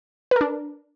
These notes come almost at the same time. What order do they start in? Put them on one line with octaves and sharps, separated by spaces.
B4 A#4 D4